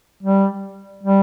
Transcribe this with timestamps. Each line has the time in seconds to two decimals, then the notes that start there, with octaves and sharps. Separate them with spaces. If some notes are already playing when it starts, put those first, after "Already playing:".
0.23 G3
1.03 G3